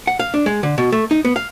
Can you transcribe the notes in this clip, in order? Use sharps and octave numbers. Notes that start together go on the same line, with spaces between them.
F#5
F5
D4
G#3
D3
B2
A3
D#4
B3
F5